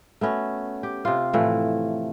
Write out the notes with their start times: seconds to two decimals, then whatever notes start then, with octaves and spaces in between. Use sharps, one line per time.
0.21 A3 B3 C#4 F#4
0.83 G4
1.05 C3 F4
1.33 A2 E3 F3 A3